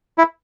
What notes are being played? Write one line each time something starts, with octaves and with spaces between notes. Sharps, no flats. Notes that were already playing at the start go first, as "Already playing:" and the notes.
E4